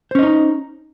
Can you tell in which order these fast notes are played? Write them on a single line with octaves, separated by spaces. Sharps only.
C5 C#4 D#5 D#4